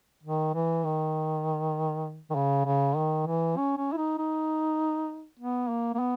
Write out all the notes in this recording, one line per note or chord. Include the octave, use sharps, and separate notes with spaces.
D#3
E3
D#3
D#3
C#3
C#3
D#3
E3
C#4
C#4
E4
D#4
D#4
B3
A#3
A#3
B3